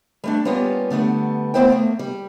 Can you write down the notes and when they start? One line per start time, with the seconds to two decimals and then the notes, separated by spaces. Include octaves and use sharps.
0.24 G3 A3 D4
0.45 G3 A#3 B3 C#4 F4 G4
0.90 D3 G3 A3 B3
1.54 A3 B3 E4 C5 E5 G5
1.70 A3 A#3
1.99 G3